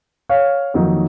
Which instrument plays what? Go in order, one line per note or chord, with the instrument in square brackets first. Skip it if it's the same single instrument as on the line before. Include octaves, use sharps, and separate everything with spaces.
[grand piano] C#5 F5
[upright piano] F2 D#3 F#3 A#3 D#4